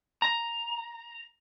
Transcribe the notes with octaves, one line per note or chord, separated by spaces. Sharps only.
A#5